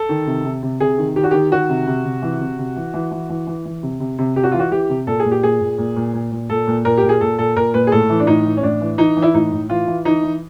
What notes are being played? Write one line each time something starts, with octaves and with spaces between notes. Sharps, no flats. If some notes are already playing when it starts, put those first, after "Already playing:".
Already playing: A4
D#3
C3
C3
C3
C3 G#4
D#3
D#3 G4
F#4
D#3 G4
D#3 F#4
C3
C3
C3
E3
C3
C3
E3
E3
E3
E3
E3
E3
C3
C3
C3
C3 G4
F#4
E3 F4
F#4
E3 G4
C3
A#2 A4
G#4
A#2
G4
A#2 G#4
A#2
A#2
A#2
A#2
A#2
A#2 A4
A#2
A#2 A#4
G4
A#2
G#4
A#2 A4
A#2 A4
A#2 A#4
A#2 B4
G#4
A2 A4
E3
D4
A2 D#4
E3
C#4
A2 D4
E3
E3 D#4
E3
E4
A2 D#4
A2
E3 F4
E3
E3 D#4
E3